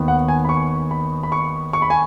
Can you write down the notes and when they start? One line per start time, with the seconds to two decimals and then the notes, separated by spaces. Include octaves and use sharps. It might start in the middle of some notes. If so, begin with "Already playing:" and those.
Already playing: D#2 D#3 B3
0.08 F#5
0.28 G#5
0.45 B5
0.49 C#6
0.91 B5
1.23 B5
1.32 C#6
1.73 C#6
1.82 B5
1.90 G#5